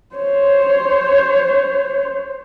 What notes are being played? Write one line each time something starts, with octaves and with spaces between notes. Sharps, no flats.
C5 C#5